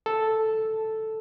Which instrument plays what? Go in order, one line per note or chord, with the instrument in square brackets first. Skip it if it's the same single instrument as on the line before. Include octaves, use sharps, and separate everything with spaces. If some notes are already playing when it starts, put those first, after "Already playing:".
[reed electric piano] A4